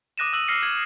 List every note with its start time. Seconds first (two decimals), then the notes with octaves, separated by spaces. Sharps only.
0.18 D6 D#6 F#6 A#6 D#7 E7
0.33 D#6 E6 F#6 D#7 F#7
0.48 E6 F6 A#6 C7 C#7
0.62 F6 G#6 F#7